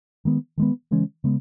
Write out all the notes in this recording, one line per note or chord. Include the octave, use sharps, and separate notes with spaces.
D#3 G#3 B3
D#3 G#3 B3
C#3 E3 G#3 C#4
C#3 G#3 B3